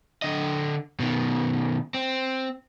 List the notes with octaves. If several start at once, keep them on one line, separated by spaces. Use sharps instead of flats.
D3 D#5
B2 D#3
C4